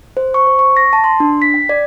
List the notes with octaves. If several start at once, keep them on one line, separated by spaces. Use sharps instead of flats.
C5
C#6
C5
C#6
A#6
A5
C6
D4
B6
G5
D5